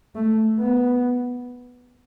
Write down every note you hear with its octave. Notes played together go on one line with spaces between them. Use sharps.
A3
B3